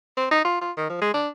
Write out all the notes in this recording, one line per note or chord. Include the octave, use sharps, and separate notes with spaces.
C4
D#4
F4
F4
D#3
F3
G#3
D4